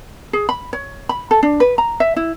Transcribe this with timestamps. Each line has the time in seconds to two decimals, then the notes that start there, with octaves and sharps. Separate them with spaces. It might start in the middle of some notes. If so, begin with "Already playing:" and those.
0.33 G#4
0.49 B5
0.73 C#5
1.09 B5
1.31 A4
1.43 D4
1.60 B4
1.78 A#5
2.00 E5
2.16 E4